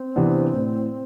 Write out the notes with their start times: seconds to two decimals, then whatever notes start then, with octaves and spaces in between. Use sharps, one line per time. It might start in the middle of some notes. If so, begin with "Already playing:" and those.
Already playing: C4
0.16 C3 E3 B3 D4
0.54 A2